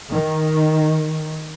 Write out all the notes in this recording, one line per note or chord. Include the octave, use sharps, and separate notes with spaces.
D#3